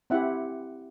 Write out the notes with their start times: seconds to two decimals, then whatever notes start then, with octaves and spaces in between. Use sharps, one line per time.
0.10 C4 E4 G4 E5 F#5